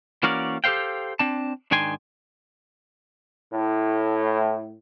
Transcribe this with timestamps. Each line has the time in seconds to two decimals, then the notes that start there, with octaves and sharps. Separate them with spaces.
0.23 E3 A#3 C#4 F#4 A#4 D5
0.64 G4 A4 A#4 C5 F5 G5
1.19 C4 D4 A5
1.71 G#2 D#3 D4 G5 G#5 C6
3.53 A2